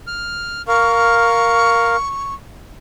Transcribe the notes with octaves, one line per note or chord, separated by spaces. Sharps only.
F6
A#4 F5 C#6